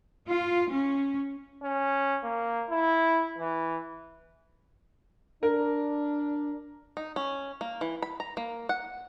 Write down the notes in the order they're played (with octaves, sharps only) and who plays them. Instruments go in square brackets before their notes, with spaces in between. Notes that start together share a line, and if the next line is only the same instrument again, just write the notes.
[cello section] F4
C#4
[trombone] C#4
A#3
E4
E3
[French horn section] D4 [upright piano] A#4
[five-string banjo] D#4
C#4
A#3
E3
B5
A#5
A#3
F#5